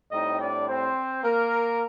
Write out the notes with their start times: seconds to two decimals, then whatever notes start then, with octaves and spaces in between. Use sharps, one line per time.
0.11 A2 G3 C4 D#4 D#5
0.39 D4 D5
0.68 C4 C5
1.24 A#3 A#4